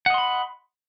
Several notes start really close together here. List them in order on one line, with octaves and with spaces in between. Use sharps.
F#5 D#5 C6 B5